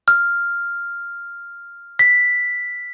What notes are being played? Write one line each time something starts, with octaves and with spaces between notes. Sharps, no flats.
F6
B6